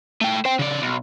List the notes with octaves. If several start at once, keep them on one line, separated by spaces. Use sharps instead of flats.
A3 G5
C5 G5
C#3 D5
B1